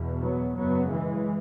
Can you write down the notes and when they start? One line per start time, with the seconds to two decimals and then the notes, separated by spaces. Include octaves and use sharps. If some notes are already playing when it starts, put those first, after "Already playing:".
Already playing: E2 B2
0.21 F#3 B3
0.57 F#2 C#3 F#3 B3
0.92 E3 G#3